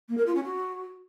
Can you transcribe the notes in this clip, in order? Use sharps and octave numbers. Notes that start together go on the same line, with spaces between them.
A#3
A#4
F4
C#4
F#4